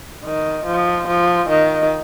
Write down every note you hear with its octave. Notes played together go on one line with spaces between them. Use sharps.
D#3
F3
F3
D#3